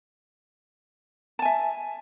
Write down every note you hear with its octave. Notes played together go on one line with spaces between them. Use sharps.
E5 G#5 A5